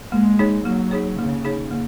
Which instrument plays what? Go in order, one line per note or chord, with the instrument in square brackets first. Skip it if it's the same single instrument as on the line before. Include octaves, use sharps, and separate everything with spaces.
[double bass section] G#3 [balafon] A#3
[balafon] D#4 G#4 C#5
[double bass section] F#3 [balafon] A#3
[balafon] D#4 G#4 C#5
[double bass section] C#3 [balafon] A#3
[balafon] D#4 G#4 C#5
A#3